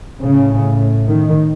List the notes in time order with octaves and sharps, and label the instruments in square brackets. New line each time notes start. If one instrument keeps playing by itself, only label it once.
[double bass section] A2 C#3
D#3